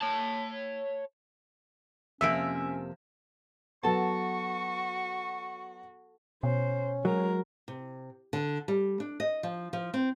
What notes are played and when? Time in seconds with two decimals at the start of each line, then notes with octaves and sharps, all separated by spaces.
0.01 C#5 A5
2.21 F2 C3 A#3 C#4 E5 E6 D7
3.83 F#3 B3 F#4 A4 A5 C#6
6.43 B2 C#4 C5
7.05 F#3 G#3 A#4
7.68 C3
8.33 D3
8.68 G3
9.00 D4
9.20 D#5
9.43 F3
9.73 F3
9.94 C4